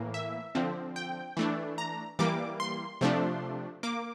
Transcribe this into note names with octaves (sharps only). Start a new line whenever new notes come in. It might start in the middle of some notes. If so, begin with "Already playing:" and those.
Already playing: A2 E3 A#3
E5
D3 F3 C4
G5
E3 A3 D4
A#5
E3 G3 A#3 D6
C6
C3 F3 A3 D4
A#3 D6